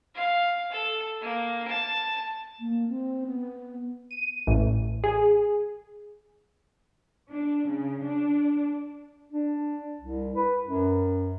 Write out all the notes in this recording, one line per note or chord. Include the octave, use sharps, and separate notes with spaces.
F5
A4
A#3
A5
A#3
C4
B3
D#7
A1
G#4
D4
C#3
D4
D4
C2
B4
F#2